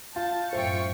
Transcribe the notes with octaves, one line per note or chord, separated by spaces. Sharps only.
F4 A5 G6 A6
F#2 A2 F4 C5 E5 G5 C#6